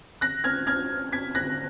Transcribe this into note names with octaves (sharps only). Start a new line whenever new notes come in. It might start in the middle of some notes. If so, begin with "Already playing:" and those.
F#6 A#6
F6 G#6
F6 G#6
G#6 B6
F#6 A#6